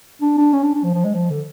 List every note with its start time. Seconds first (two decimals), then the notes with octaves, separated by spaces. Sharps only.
0.22 D4
0.38 D4
0.53 C#4
0.63 D4
0.74 D4
0.84 F3
0.94 F3
1.05 G#3
1.15 F3
1.30 D3